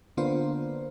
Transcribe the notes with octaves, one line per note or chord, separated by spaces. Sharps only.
D3 A#3 B3 D4 F4 C5